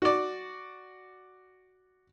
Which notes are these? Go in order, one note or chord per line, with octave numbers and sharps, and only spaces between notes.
F#4 D5